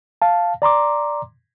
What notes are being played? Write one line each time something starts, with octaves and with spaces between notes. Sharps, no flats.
F5 A5
D5 A#5 C6 D6